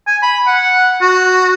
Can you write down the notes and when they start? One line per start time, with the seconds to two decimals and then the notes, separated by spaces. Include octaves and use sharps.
0.07 G#5
0.23 B5
0.47 F#5
1.02 F#4